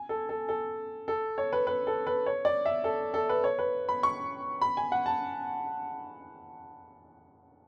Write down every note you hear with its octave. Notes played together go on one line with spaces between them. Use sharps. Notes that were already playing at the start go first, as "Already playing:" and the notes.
Already playing: G#5
A4
A4
A4
A4
C#5
B4
B4
A4
B4
C#5
D5
E5
A4
A4
B4
C#5
B4
B5
C#6
B5
G#5
F#5
A5